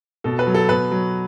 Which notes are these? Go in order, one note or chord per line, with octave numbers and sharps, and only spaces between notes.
B2 A4
B4
F#3
A4
B2 B4
F#3